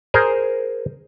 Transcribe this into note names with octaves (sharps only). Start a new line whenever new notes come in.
G#4 A#4 C5